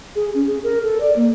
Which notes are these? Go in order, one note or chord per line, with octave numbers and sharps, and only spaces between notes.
G#4
C#4
G#4
A#4
A4
D5
A#3